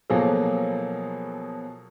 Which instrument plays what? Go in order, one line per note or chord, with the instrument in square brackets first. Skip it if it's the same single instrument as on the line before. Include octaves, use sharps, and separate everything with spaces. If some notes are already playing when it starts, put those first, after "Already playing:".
[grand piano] B2 F3 F#3 A#3 G#4 A4